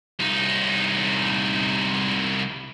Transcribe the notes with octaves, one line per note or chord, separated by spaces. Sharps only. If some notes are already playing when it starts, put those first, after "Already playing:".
C2 D#4